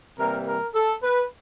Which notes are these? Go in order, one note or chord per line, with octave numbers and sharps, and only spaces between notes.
C3 E3 G3 A#3 A#4
A#4
A4
B4